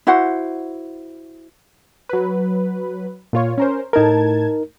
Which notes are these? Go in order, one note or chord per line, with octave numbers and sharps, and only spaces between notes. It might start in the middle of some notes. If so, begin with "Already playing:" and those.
E4 F#4 C5 F#5
F#3 B4
A#2 F4 C#5
C#4 A#4 C5
A2 D#4 A#4 A5 G#6